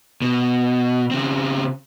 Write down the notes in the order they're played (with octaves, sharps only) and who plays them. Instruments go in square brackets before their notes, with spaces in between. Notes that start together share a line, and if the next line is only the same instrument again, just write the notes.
[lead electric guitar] B2
C#3 C4